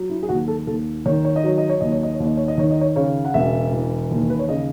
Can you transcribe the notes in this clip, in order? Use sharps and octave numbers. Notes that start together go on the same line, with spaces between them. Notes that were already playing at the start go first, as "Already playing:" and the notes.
Already playing: F#3
E4
G#4
D#2 F#4
A4
D#2 A4
D#3 C#5
C#5
D#5
F#3 C#5
D#5
C#5
D#2 D#5
C#5
D#5
C#5
D#2
D#5
C#5
D#5
D#3 C#5
D#5
C#5
C#3 C#5
F#5
E1 E5
E3
D#2
B4
C#5
C#3 D#5